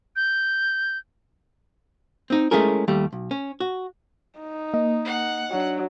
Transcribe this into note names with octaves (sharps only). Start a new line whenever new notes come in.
G6
C4 D#4
G#3 A3 C#4 E4 G#4 A#4
D#2 G3 A3
B1
C#4
F#4
D#4
A#3 D#5
F#5
F#3 D4 F#4